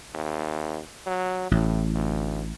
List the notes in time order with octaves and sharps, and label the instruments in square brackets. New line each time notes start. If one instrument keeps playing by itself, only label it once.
[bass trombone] D#2
F#3
[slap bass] A1 [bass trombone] A2
[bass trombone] D2